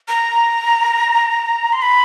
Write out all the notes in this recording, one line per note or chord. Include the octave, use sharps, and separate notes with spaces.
A#5
C6
B5